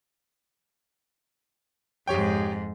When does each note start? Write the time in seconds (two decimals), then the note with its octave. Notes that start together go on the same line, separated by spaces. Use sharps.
2.08 F2 G#2 G4 C#5 G5